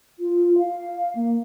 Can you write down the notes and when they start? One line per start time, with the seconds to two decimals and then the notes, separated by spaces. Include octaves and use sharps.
0.19 F4
0.58 F5
1.15 A#3